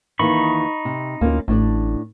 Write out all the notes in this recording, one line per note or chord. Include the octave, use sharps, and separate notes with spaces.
D#2 D#3 E3 D#4 B5 C#6
C3
D2 A#3 C#4 F4
A1 A2 D4 D5